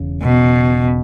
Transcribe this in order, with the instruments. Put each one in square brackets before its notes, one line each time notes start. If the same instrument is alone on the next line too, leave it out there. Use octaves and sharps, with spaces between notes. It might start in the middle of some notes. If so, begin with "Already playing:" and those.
Already playing: [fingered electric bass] E1 E2 C#3
[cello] B2